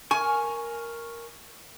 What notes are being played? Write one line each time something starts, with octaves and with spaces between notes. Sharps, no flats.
A#4 G#5 C#6